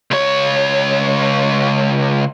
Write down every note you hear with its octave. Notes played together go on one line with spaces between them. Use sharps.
C#2 C#5